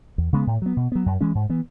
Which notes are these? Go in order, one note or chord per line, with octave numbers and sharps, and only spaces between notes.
E2
C#3 G#3 B3
A2
F#3 B3
B2
F#3 B3
F#2
E3 G#3 C#4
G#2
E3 B3